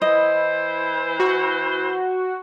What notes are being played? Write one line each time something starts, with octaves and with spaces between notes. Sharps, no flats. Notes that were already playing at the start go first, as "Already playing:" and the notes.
E3 E4 C5 D#5
F#4